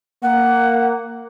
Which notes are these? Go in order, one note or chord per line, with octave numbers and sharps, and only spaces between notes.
A#3 F#5